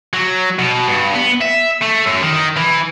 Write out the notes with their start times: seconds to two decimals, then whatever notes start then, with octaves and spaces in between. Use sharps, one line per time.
0.14 F#3
0.59 B2
0.88 G2
1.15 B3
1.41 E5
1.82 A3
2.07 F#2
2.22 D#3
2.57 E3